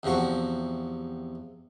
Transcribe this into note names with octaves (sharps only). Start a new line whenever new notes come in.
E2 C3 F3 F#4 C#6